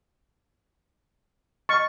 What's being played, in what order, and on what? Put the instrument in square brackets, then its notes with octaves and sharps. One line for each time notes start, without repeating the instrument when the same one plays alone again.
[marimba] D#5 F6 A6 [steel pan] C#6